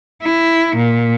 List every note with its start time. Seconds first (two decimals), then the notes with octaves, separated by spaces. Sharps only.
0.23 E4
0.76 A#2